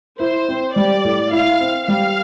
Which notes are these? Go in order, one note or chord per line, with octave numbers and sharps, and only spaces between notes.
E4 C5
C4
G3 D5
A2
E4 F5
C4
G3 F5